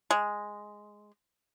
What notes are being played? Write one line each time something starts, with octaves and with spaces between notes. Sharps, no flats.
G#3